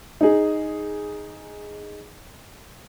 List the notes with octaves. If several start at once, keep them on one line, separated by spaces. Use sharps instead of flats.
D#4 G#4